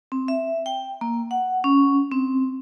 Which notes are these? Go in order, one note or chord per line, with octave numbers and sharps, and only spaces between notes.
C4
E5
G5
A#3
F#5
C#4
C4